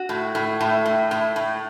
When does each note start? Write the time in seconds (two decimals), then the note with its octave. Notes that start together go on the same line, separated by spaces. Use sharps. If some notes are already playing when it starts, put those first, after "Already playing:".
Already playing: F#4
0.09 A2
0.35 A2
0.61 A2
0.86 A2
1.11 A2
1.36 A2